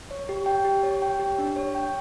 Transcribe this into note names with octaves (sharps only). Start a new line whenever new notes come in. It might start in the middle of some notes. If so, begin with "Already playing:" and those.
C#5
G4
G5
G4
C#5
G5
G4
D4
C#5
G5